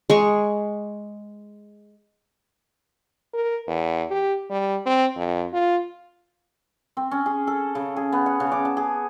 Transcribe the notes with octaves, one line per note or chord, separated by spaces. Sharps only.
G#3 G#4 C#6
A#4
E2
G4
G3
C4
F2
F4
C4
C#4
G#4
A4
C#3
G#4
B3
F#5
C#3
D6
A5
G#4